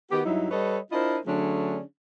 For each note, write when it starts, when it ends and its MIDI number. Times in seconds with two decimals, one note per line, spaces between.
0.11 0.20 51
0.11 0.20 59
0.11 0.20 66
0.11 0.20 67
0.25 0.48 43
0.25 0.48 54
0.25 0.48 63
0.25 0.48 64
0.51 0.77 55
0.51 0.77 69
0.51 0.77 71
0.51 0.77 73
0.51 0.77 75
0.92 1.17 62
0.92 1.17 64
0.92 1.17 65
0.92 1.17 70
0.92 1.17 72
0.92 1.17 75
1.26 1.80 50
1.26 1.80 54
1.26 1.80 57
1.26 1.80 61
1.26 1.80 62
1.26 1.80 68